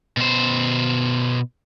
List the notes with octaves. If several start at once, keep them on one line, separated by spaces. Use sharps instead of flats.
B2 C5